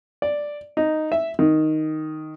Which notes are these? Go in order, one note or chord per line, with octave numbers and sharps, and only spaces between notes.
D5
D#4
E5
D#3